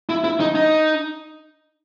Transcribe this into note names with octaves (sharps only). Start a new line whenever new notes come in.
E4
E4
D#4
D#4